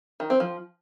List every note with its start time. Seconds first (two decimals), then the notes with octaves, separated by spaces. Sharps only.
0.20 D#3
0.30 C4
0.40 F3